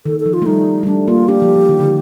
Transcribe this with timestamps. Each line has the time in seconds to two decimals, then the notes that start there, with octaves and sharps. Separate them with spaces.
0.05 D#3 A4
0.20 A4
0.26 F3
0.33 F4
0.42 A3
0.46 G3 D#4
0.83 G3
0.87 A3 D4
1.08 A#3 F4
1.28 D4 G4
1.42 F3
1.55 F3
1.69 D#3
1.80 D3